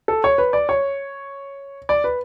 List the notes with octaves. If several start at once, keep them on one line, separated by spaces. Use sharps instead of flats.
A4
C#5
B4
D5
C#5
D5
B4